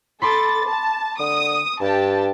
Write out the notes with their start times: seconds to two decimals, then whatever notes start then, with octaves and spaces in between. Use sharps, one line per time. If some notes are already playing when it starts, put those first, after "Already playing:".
0.22 A4 B5 C6 D6 A6
0.67 A5
1.20 D3 D#6
1.81 G2 G4 A5